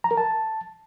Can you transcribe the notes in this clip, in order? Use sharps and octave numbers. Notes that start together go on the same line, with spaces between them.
A#5
A#4
A5